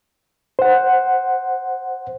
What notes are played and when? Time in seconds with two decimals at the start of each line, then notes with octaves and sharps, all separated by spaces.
0.59 C5 F#5